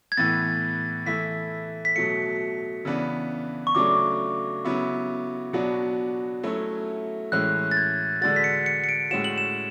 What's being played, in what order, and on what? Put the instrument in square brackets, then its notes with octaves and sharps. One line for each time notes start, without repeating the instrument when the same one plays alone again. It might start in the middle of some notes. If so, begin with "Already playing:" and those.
[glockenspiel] G#6
[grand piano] A2 E3 B3 [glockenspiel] A6
[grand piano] E3 A3 E4 [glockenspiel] B6
[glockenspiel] B6
[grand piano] B2 F#3 A3 [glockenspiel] C#7
[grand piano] C#3 E3 B3 D4
[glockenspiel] C#6
[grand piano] C#3 F#3 A3 D4 [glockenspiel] D6
[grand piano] C#3 F#3 B3 E4
B2 F#3 B3 D4 F#4
F#3 A3 C#4 E4
[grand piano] A2 E3 G#3 C#4 [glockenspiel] F#6
[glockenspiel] A6
G#6
[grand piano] D3 G#3 D4 F#4 [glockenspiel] A6
[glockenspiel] B6
C#7
C#7
C#7
D7
[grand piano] A2 G#3 C#4 F#4 [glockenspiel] E7
[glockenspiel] F#7
E7